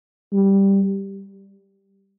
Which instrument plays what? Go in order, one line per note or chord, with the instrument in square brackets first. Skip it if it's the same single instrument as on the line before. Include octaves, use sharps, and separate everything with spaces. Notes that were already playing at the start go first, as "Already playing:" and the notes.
[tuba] G3